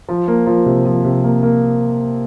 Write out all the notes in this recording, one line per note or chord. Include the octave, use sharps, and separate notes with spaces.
F3
A#3
F3
C3
F3
C3
A#3
A#3